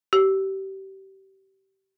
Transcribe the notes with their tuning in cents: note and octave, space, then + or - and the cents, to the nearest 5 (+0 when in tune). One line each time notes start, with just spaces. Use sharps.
G4 -25